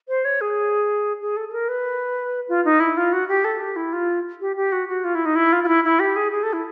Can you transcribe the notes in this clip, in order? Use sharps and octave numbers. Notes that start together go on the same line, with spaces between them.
C5
C#5
G#4
G#4
A4
A4
A#4
B4
F4
D#4
E4
F4
F#4
G4
A4
G4
E4
F4
G4
G4
F#4
F#4
F4
E4
D#4
E4
F4
F4
E4
E4
G4
G#4
G#4
A4
E4